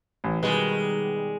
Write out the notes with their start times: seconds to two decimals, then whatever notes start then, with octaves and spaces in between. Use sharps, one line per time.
0.24 A1
0.43 B2 D#3 G3 G#3 B4